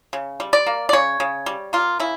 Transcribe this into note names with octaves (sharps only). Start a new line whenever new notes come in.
C#3
G3
D5
A#3
D5
C#3 C#5
C#3
G3
A#3 F4
C#3 E4